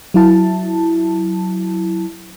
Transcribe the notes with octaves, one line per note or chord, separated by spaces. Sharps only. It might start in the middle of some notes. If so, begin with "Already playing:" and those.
F#3 E4 A5